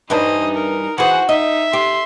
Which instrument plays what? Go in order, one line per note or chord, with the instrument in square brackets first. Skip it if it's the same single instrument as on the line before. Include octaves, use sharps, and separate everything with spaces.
[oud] G2 E3 D4 [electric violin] D#4 [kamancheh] C5 D#5
[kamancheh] A#4
[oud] E3 G#4 [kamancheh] F#4 C5 [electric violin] F#5
[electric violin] D#4 [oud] D#5 [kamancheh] E5
[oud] G4 [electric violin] C6